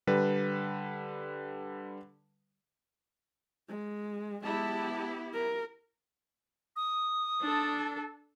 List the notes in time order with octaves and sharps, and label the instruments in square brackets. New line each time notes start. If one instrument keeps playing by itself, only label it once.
[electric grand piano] D3 G3 B4
[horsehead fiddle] G#3
[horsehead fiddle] G#3 A5 [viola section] B3 E4 G4
[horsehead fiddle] A#4
[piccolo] D#6
[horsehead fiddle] D4 A4